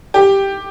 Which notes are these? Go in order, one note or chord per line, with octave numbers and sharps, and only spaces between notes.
G4